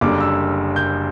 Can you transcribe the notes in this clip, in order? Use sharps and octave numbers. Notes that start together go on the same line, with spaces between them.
F#1 F#2 D3 G3 D6
E6
G6